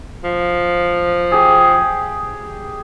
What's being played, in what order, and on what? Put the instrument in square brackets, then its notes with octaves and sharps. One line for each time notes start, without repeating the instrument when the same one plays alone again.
[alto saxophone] F3
[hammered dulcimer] G4 G#4